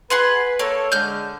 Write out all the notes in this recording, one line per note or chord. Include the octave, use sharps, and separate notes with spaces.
G#4 B4 F#5 C6
A#3 A4 C#5
D3 G#3 F6 G6